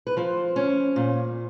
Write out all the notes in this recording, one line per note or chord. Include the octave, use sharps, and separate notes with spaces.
B4
F3 C5
C#4
A#2